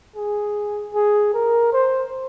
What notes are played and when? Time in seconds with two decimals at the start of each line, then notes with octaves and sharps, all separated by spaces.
0.16 G#4
0.94 G#4
1.34 A#4
1.73 C5